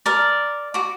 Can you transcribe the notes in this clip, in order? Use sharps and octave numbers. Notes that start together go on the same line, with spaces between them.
A#4 D5
F#4 D6